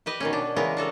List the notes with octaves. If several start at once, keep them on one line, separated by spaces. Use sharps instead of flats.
G4 B4 D#5
B2 D#3 C#4
D4
C#3 E3 G#3 B3 A#4
D4 F#4 A4 A#4